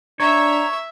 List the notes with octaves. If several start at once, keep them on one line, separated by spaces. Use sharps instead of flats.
D4 C#5 E5 A#5